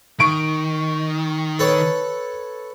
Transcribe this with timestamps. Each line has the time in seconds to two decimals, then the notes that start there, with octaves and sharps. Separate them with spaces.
0.20 D#3 C#6 D7
1.59 A4 B4 C#5